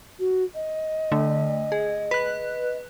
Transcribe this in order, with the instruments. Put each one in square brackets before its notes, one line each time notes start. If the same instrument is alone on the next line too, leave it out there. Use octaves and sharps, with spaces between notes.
[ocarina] F#4
D#5
[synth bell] D3 A3
G#4
B4 F#6